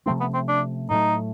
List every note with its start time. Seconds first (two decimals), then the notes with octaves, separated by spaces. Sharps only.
0.06 C3 F3 A3 C4 C#4
0.20 B3
0.34 C4
0.48 D4
0.90 A2 F#3 A3 D#4